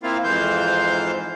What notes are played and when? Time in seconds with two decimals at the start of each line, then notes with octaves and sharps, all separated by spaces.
0.03 A#3 C4 E4 F4 F5
0.24 F2 G#2 E3 C5 F5 G6